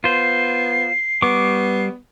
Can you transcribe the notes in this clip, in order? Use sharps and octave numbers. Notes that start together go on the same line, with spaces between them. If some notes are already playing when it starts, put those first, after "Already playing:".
B3 F4 C5 C7
G3 B3 C#6 D6